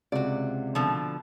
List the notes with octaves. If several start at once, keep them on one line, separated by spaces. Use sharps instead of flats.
C#2 C3 F#4 D5
B2 D3 F3